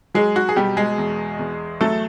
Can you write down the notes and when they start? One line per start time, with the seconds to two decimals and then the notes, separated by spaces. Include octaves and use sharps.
0.15 F#3 G#3 G#4
0.36 F#4
0.49 G#4
0.56 B2 G3 G4
0.77 G#3 G#4
0.98 E2
1.39 E2
1.81 F#3 A3 A4